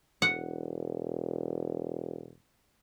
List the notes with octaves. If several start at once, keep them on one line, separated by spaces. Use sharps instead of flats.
E1 F#5